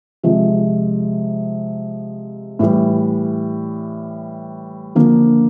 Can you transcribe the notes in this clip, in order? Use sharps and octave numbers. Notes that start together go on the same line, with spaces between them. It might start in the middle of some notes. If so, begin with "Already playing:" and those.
C3 F3 G#3
A2 E3 G3
D3 F3 A#3